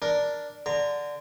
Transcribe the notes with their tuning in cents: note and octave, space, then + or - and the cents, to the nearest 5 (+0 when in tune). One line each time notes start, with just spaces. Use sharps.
D4 +0 A#4 +5
D3 +0 A#5 -15